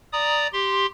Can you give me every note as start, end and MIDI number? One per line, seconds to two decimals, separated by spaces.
0.13 0.47 74
0.13 0.47 82
0.13 0.47 87
0.53 0.86 67
0.53 0.86 84